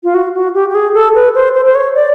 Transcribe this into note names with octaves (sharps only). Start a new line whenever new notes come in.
F4
F#4
F#4
G4
G4
G#4
A4
B4
C5
C5
C5
C#5
D5